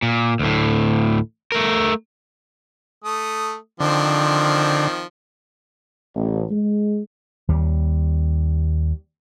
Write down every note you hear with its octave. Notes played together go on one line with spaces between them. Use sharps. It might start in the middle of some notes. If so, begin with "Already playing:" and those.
A#2
D2 A2
A3 A#4
A3 D#6
D3 D#3 F3 C4
A1
G#3
D#2 G3